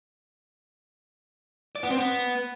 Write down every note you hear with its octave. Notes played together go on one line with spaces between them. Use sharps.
D5
B3
C4
B3